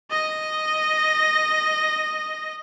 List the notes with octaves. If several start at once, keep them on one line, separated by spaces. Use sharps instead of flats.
D#5 A#6